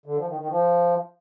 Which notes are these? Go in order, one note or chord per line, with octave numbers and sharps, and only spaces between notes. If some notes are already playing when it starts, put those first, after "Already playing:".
D3
F3
D#3
D#3
F3